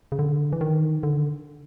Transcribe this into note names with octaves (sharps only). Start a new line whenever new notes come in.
C#3
D3
E3
D#3
D3